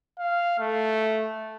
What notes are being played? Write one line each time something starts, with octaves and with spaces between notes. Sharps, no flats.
F5
A3